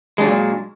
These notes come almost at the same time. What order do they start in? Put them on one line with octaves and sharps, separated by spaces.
G#3 D4 F#3 A#2